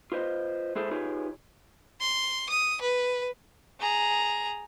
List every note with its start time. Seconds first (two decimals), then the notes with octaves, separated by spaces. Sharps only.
0.12 F4 B4 C5 D#5
0.75 G#3 E4 G#4 A4 C5
0.91 D#4 F4 G4 G#4 B4 C#5
2.00 C6
2.49 D#6
2.82 B4
3.80 G#4 A#5